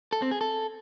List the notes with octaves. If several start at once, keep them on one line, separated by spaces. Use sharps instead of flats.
A4
C4
G#4
A4